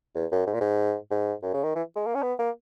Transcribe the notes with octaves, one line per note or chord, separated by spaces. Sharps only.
E2
F#2
G#2
A#2
G#2
G#2
F#2
C#3
D#3
E3
G#3
A#3
C#4
B3
A#3